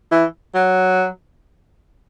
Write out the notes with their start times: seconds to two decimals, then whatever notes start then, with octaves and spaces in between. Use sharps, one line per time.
0.12 E3
0.55 F#3